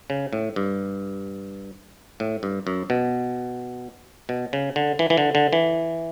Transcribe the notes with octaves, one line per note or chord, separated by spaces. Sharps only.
C#3
A2
G2
A2
G2
F#2
B2
B2
C#3
D3
E3
E3
D3
D3
E3